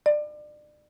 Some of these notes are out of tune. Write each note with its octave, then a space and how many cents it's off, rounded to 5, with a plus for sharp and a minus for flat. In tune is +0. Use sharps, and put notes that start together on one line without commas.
D5 +30